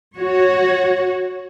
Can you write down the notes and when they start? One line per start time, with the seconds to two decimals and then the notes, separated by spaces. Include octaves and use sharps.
0.17 F#4 C#5